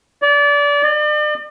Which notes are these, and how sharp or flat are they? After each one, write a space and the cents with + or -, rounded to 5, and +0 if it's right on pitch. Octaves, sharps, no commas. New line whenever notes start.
D5 -25
D5 +40